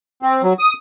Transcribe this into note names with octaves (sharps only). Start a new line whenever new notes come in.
C4
F#3
D#6